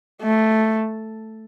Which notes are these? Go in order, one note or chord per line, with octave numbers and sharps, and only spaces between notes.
A3